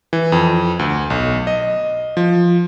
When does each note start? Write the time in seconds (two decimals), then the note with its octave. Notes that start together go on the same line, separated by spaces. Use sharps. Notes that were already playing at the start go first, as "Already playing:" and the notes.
0.13 E3
0.32 F2
0.79 D2
1.10 B1
1.47 D#5
2.17 F3